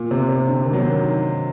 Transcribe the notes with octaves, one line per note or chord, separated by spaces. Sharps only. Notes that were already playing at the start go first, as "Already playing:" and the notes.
Already playing: A#2
C3
C3
D3
D#3
F#3
D#3